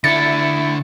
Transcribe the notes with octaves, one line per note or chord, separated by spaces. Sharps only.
D3 E4 E5 A6 C#7